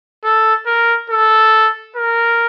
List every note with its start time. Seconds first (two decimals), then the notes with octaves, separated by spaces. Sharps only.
0.24 A4
0.67 A#4
1.10 A4
1.96 A#4